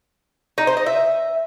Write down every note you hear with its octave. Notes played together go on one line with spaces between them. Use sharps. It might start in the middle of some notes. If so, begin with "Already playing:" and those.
D#4
C5
D#5
E5